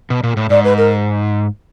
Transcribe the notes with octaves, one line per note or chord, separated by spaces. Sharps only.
B2
A#2
A2
G#2 D5
B4
A#4